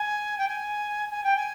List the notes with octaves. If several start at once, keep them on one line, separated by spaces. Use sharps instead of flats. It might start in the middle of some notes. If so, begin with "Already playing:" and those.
Already playing: G#5
G5
G#5
G#5
G5
G#5